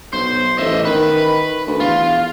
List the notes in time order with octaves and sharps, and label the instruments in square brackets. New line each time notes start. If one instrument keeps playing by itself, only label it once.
[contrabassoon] B1 [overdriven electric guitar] C5
[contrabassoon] A1 [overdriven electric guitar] D#5 E5
[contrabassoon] D#3 [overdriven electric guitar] B4
[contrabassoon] D2
[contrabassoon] E2 [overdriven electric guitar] F4